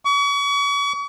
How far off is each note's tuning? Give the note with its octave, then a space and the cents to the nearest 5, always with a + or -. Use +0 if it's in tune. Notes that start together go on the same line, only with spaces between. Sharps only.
C#6 +40